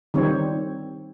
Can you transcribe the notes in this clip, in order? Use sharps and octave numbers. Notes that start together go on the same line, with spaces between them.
D#3 G3 C4 C#5